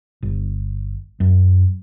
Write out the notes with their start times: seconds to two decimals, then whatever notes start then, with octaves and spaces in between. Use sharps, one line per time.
0.23 G1
1.20 F#2